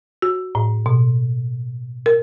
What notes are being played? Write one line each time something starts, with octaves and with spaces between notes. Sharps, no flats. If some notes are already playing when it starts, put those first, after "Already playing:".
F#4
A2
B2
A#4